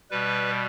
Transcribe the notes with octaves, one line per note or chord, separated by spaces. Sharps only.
B2 G3 B4